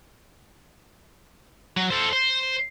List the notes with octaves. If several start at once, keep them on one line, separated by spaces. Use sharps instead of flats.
F#3
A4 C5
C5